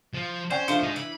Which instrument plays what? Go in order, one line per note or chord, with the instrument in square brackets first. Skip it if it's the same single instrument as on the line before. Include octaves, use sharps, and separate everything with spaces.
[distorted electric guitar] F3 F4
[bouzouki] C#4 [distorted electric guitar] C5 [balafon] D5 F#5 G5
[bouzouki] F3 A3 [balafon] D4
[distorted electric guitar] D#4 G#4
[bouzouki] E3 [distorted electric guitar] B5